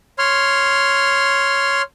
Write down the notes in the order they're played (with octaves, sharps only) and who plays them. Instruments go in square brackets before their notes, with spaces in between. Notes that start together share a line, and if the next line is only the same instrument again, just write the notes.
[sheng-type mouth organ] C#5 C6 F6